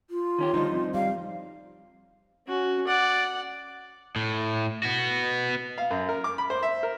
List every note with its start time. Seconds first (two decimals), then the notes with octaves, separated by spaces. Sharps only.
0.10 F4
0.38 D#3 C#4 G4
0.54 D3 F3 G3 D#4 D#5
0.71 C2 F2
0.94 G3 F5
2.47 C#4 F#4
2.87 D5 F#5
4.16 A2
4.83 B3 F#4
5.78 F5
5.91 F#2
6.09 A#4
6.24 D6
6.38 B5
6.50 C5
6.63 E5
6.83 A#4